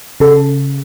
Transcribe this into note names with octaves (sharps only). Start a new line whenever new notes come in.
C#3 A4